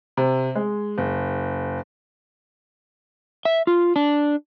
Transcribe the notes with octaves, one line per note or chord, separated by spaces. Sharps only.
C3
G#3
F#1
E5
F4
D4